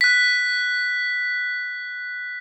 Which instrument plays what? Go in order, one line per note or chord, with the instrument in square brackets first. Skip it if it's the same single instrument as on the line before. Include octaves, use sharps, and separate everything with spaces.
[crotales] F#6 B6